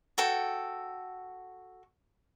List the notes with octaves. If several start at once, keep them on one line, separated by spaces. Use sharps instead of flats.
F#4 A4 G5